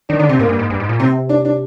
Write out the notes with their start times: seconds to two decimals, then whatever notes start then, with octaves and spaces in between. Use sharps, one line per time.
0.09 D#3 D4
0.19 D3 D4
0.29 C3 C4
0.39 G#2 A#3
0.49 G2
0.59 G#2
0.70 G2
0.80 G#2
0.89 A#2
1.00 C3 C4
1.29 D4
1.45 D4